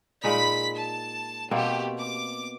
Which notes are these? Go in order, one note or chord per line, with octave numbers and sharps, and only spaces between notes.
A#2 G#3 D#4 B5 B6
A5
B2 A3 A#3 C4 G4
D6